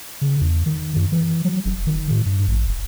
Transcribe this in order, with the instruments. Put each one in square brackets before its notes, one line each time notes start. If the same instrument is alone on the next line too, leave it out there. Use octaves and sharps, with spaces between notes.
[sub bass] C#3
E2
D#3
F#2
E3
F#3
F1
D#3
A2
G2
A1
F1